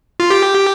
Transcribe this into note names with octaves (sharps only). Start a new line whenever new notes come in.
F4
G4